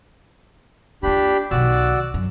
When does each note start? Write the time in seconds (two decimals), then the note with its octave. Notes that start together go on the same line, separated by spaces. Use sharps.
1.03 A#3 D4 F4 G4 B5
1.51 B1 D#3 F#4 D5 E6
2.14 F#2